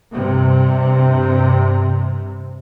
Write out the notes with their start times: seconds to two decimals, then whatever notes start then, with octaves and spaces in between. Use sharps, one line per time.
0.13 G2 C3